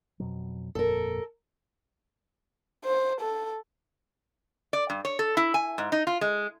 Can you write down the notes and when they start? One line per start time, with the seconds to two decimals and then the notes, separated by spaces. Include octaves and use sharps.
0.20 F2 B2 F#3
0.75 G1 F2 A#2 A4 A#4
2.84 C5
3.20 A4
4.73 D5
4.90 G2
5.05 C#5
5.19 A4
5.37 E4
5.54 G#5
5.78 G#2
5.92 D#4
6.07 F4
6.21 G#3